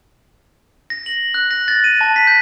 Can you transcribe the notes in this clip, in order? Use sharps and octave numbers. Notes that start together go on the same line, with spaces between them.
A#6
F#7
F#6
A#6
A6
D#7
A5
B6
G6